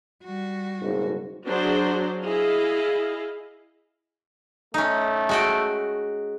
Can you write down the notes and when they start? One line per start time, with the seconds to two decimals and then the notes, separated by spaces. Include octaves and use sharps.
0.24 G3 F#4
0.80 F#1 B1 G#2
1.45 F#3 D4 F#4 G#4 C5
2.23 E4 G#4 D#5 F5
4.74 A3 C#4 D#4
5.29 G#3 F#4 G5